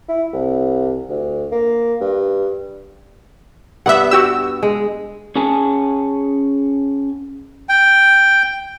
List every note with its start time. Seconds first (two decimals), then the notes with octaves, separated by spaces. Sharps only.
0.09 E4
0.33 C2
1.10 D2
1.52 A#3
2.01 G2
3.86 G2 B3 E5 F#5
4.11 F#4 G4 E6
4.63 G#3
5.36 C#4 G#4 F#5 G#5 A5
7.69 G5